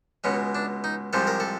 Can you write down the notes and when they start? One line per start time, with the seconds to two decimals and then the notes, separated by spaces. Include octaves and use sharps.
0.24 C#2 B2 G#3 C#4
0.55 D4
0.84 D#4
1.13 C2 C3 F3 G#3 A4
1.27 A#4
1.40 A4